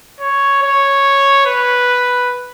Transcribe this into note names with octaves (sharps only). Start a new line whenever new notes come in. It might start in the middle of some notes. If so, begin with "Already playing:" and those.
C#5
C#5
B4